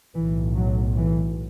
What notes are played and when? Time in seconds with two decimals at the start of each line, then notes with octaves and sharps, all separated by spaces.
0.14 B1 A2 E3
0.55 F#3
0.96 E3